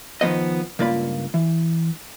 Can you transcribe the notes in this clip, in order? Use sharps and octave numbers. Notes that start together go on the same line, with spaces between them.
D#3 F3 F#3 B3 D#5
C#2 G2 A#3 F4 D5 B5
E3